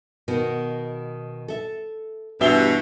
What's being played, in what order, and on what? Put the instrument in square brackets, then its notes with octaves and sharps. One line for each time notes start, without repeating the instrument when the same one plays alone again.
[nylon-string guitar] B2 D#3
A4 E5
[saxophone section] E2 G2 B2 [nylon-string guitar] G4 C5 [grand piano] E5 E6 G7